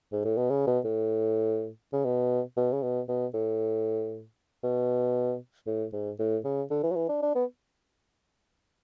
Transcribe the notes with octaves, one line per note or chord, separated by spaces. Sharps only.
G#2
A2
B2
C#3
B2
A2
C#3
B2
B2
C#3
B2
B2
A2
B2
A2
G#2
A2
C#3
D3
E3
F#3
E3
D4
D4
B3